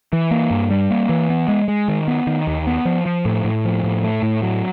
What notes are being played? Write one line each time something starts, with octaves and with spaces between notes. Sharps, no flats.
E3
A#3
G2
G3
A#3
E3
B3
G#3
G#3
D#3
B3
D#3
D#2
B3
F3
F3
A2
A2
F3
A2
A3
A2
F#3